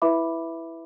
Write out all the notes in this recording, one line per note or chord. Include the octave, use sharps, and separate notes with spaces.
E4 B4 E5 B5 D6